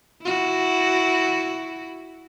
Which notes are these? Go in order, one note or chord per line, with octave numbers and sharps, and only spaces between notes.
E4 F#4